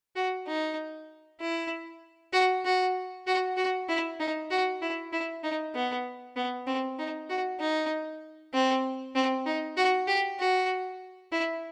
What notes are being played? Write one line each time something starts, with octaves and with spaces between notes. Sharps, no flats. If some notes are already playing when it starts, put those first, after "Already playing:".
F#4
D#4
E4
F#4
F#4
F#4
F#4
E4
D#4
F#4
E4
E4
D#4
B3
B3
C4
D#4
F#4
D#4
C4
C4
D#4
F#4
G4
F#4
E4